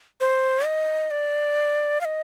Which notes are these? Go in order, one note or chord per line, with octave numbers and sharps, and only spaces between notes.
C5
D#5
D5
F5
D#5